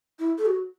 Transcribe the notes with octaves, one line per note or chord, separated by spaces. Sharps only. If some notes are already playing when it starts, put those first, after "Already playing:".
E4
A4
F#4